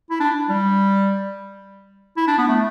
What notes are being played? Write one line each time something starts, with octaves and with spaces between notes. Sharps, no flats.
E4
D4
G3
E4
D4
B3
A3